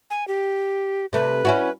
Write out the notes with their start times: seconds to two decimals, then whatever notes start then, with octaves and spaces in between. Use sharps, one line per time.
0.10 G#5
0.28 G4
1.13 C3 A3 B4
1.45 C#4 E4 F#4